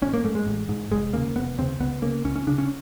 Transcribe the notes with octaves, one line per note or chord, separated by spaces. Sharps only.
A1 C#4
A#3
G#2 A3
G#3
A1
G#2
F1 G#3
D#2 C#3 A#3
F1 B3
D#2 C#3 C4
C#2 B3
C#3 A#3
C#2 C#4
C#4
C#3 D4
C#4